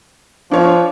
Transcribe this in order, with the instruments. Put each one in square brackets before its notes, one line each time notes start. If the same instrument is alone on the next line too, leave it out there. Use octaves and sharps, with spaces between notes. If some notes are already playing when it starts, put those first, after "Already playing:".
[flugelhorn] F3 [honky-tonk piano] D4 C#5